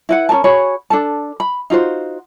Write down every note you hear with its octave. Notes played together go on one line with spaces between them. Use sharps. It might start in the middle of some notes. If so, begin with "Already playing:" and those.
E4 B4 F#5
C#4 G#4 A#4 A5
F#4 G#4 C#5 B5
D4 A4 A5
B5
D#4 F4 F#4 C5